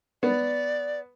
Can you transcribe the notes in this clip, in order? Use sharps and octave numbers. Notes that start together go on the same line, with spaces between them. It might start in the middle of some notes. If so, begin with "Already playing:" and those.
B3 D5